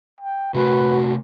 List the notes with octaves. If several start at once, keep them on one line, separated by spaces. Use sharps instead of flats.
G5
C3 A3 F#4 A#4 B4